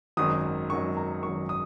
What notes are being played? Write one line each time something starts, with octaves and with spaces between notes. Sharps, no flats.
G#1 F#2 D#3 F#3 D#6
G#1 F#2 D#3 F#3 C#6
A#5
G#1 F#2 D#3 F#3 C#6
D#6